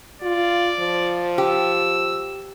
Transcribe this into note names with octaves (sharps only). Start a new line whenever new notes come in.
F4 D5
F3
G4 E6